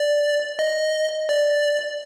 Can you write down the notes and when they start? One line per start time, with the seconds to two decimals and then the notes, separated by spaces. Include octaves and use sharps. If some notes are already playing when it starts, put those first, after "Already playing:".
Already playing: D5
0.59 D#5
1.29 D5